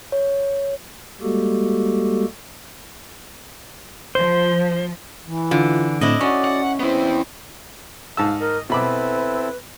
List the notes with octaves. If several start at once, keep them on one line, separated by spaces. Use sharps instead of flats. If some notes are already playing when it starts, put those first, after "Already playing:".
C#5
G3 G#3 A#3 F#4 G4 A4
F3 C5
E3
D3 F4
A2 C4 D4 E4 D#5
C#4 F#4 D5 C#6
F#5
B3 C4 E4
G#2 F5 A5 E6
A#4 D#5
B2 C4 E4 A4 B4 B5 D6